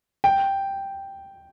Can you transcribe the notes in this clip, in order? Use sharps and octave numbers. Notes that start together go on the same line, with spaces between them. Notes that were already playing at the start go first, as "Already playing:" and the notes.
G5